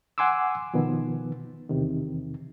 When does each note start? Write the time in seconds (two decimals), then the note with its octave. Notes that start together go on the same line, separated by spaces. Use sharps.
0.18 F#5 G#5 C6 D6 E6
0.74 B2 D#3 F3 B3
1.69 E2 C3 D#3